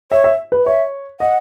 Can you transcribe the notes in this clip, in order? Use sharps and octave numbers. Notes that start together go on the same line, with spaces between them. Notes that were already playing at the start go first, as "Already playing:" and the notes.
C#5 E5
E5
B4
C#5 E5
D#5 F#5